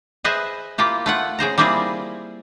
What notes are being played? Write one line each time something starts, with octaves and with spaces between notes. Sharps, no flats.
G#4 B4 C5 D#5 E5 G#5
A#3 E4 F4 G4
A3 F4 F#5
C#3 G#4 C5 A#5
G3 A#3 C4 E4 F4 G#4